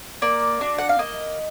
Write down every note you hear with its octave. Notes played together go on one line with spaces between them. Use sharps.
A#3 D5
D4 F#4
F#5
F5
A#3 D#5